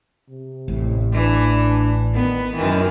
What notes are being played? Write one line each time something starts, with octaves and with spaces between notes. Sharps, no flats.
C3
A1 A2
E3 D4
D#3 B3
F#2 D#3 E3 D#4